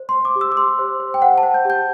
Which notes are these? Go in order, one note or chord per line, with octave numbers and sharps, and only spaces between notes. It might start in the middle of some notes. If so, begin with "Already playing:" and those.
Already playing: C5
C6
C5
D6
G4
E6
D6
G4 C6
C5
C5
G5
C5 F#5
A5
C5
G6
G4 G6